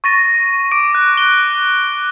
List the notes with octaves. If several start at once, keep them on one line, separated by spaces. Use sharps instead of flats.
C#6 A6 A#6 D#7
D6 D7
F#6
G7